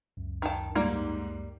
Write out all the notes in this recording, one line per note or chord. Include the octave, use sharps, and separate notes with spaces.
C#2 F#2
D#3 A5
G#2 G3 A#3